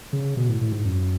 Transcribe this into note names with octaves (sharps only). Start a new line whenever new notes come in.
C#3
B2
A2
A2
G#2
F#2